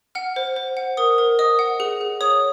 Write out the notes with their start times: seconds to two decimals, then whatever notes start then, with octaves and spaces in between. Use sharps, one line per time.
0.15 F#5 F6
0.36 C5
0.56 C5
0.77 F#5
0.97 A#4 D#6
1.18 A#4
1.39 D#5 D#6
1.59 F#5
1.80 G#4
2.01 G#4
2.21 C#5 D#6